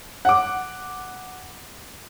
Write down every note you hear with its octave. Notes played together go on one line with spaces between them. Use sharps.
F#5 D6